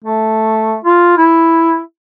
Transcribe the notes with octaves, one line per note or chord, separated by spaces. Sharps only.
A3
F4
E4